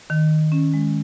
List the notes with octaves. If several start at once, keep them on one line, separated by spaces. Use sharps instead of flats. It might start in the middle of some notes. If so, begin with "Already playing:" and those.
D#3
C#4
G#3